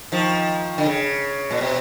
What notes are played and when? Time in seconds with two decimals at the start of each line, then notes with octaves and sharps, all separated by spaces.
0.12 D#3 F3
0.78 D3
0.86 C#3
1.51 A#2
1.61 B2